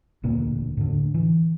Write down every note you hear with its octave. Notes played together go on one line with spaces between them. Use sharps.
E1 D2 A#2 A#3
A2 D3
E3